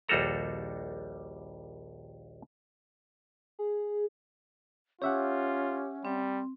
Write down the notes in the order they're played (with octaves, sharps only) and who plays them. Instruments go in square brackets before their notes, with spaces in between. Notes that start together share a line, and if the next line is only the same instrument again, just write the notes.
[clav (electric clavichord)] A#1 D#2 G3 F#4 A4 A#5
[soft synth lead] G#4
[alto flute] C#4 [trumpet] F4 [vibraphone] G4 D6 [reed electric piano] C#5 E5 F#5
[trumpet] G3 [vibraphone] C4